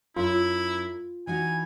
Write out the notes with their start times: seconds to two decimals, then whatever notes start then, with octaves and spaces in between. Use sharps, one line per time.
0.16 F#2 E4 F4
1.27 E3 D#4 F#4 G#5